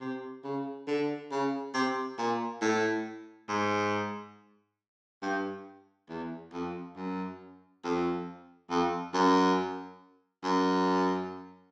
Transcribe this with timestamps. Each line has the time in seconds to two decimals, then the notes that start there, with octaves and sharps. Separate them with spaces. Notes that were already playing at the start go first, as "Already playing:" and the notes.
0.01 C3
0.44 C#3
0.88 D3
1.31 C#3
1.74 C3
2.18 A#2
2.62 A2
3.49 G#2
5.23 G2
6.09 E2
6.53 F2
6.96 F#2
7.84 F2
8.70 F2
9.14 F#2
10.44 F#2